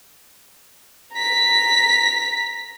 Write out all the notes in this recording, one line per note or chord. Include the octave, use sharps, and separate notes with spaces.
A#5 B6